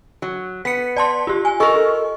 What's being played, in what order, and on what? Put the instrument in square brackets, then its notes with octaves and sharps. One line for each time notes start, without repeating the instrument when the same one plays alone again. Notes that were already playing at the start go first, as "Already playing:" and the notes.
[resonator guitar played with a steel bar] F#3
[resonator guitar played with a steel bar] B3 [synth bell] B6 C#7
[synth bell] D5 A5 C6
F4 G4
G#5
[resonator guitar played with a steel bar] A4 A#4 [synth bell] D#5 C#6